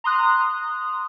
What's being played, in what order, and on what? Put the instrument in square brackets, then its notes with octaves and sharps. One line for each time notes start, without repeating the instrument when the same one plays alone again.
[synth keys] A#5 C6 D#6 F#6